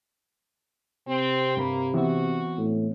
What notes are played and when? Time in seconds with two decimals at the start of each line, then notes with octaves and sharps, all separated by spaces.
1.07 C3 C4
1.57 G2 A#3 B5
1.94 E3 B3 C4 F#4
2.57 A2